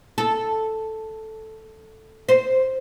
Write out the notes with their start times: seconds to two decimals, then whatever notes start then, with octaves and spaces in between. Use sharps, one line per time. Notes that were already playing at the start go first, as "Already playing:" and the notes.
0.18 A4
2.29 C5